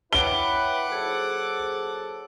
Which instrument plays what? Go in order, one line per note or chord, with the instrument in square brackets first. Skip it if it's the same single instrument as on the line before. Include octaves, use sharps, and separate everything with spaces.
[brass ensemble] E4 B4 [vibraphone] C#5 G5 [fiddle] F#5 D6 [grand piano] G7
[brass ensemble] D#2 F#3 A4 [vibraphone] G#4 C5